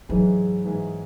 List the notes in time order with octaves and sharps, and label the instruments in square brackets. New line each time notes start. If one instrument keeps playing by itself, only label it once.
[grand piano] G#2 E3 G#3 [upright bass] F#3
[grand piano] G#2 E3 G#3